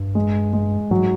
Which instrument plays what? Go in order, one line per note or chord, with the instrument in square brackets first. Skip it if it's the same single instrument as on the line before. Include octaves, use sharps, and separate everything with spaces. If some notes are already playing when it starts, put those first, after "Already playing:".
Already playing: [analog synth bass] G2
[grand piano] G#3
G#3
[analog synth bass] G#2 [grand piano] F#3